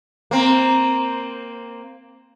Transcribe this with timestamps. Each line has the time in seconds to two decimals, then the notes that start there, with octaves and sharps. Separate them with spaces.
0.31 A#3 C4